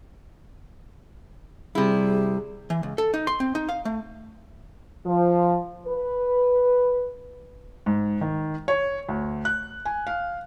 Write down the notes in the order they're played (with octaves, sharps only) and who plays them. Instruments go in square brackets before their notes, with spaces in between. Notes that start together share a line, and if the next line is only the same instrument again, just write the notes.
[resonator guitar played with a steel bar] C3 E4 [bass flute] G3 [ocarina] G#4
[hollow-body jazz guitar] E3
C#2
A4
D#4
C6
C4
D#4
F5
A3
[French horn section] F3
B4
[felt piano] G#2
D#3
C#5
D2
F#6
G#5
F5